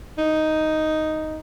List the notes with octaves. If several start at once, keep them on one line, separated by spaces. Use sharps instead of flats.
D#4